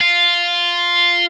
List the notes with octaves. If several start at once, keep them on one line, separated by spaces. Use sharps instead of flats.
F4